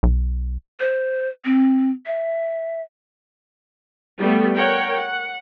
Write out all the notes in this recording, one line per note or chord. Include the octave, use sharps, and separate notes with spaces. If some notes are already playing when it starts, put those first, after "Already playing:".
B1
C5
C4
E5
G3 A3 B3
A#4 C#5 F#5 G5
F#5